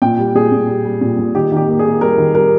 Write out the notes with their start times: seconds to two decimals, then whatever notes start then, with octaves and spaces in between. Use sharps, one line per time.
0.02 A#2 G5
0.18 G3
0.35 A#2 G#4
0.52 A#2
0.68 G3
0.85 G3
1.01 A#2
1.19 A#2
1.35 D#3 G4
1.52 D#3 G4
1.68 A#3
1.79 G#4
1.85 A#3
2.01 G3 A#4
2.18 D#3
2.34 G3 A#4